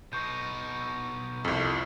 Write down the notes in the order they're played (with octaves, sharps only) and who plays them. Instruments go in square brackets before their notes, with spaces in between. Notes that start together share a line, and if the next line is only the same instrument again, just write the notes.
[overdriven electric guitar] B2 D#4 [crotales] C#6 G6
[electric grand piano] C2 F2